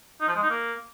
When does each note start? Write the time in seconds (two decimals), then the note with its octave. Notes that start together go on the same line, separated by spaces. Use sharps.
0.21 D#4
0.28 F3
0.36 G#3
0.43 D#4
0.50 A#3